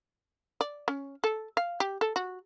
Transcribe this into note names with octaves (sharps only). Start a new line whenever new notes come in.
D5
C#4
A4
F5
G4
A4
F#4